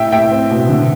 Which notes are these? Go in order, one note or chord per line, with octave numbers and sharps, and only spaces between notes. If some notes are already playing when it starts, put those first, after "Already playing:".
Already playing: A2 E5 G5
A2 E5 G5
C4
B2
D3